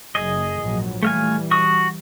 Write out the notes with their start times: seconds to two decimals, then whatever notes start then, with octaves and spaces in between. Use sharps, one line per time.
0.15 F#1 G#4 D#5
0.61 A#1 G#2 F#3
1.03 E3 G3 A3 F5 G#5
1.51 F#4 C#6 D#6